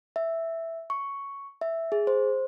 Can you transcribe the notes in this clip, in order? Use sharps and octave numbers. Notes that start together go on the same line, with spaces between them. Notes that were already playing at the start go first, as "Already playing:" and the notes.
E5
C#6
E5
G#4
C5